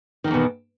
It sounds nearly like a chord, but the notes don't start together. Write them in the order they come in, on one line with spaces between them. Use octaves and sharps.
D#3 G2 E2 B2